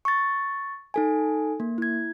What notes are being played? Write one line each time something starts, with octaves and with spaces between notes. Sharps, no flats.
C#6 A6
D#4 A4 G#5
A#3
E4 G#6